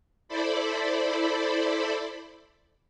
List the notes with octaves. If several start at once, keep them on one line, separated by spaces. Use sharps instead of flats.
E4 A4 C5 D5 B5